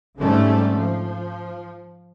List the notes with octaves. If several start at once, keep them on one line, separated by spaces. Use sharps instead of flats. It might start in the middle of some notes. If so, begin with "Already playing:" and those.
G#2 D3 G3 A3 C4 C#4
F3